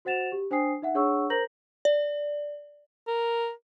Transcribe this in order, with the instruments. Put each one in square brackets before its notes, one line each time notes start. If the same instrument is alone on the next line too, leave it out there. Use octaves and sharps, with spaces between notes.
[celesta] F#4 C5 F#5 A6 E7 F7
G4
D4 C5 G5 G#5 D#6 C7
D#4 E5 F#5
D4 G#4 C#5 F#5 C#6 E6
A#4 C5 A#5 G6 A#6 F#7
[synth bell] D5
[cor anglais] A#4